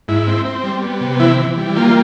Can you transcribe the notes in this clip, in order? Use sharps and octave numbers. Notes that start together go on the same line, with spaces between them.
G#2 E4
C4
C4
G3
B3
C3
E3 E4
E3
G3
A#3 F4